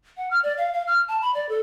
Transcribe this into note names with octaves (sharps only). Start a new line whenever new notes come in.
F#5
F6
D5
F5
F5
F6
A5
B5
D5
A4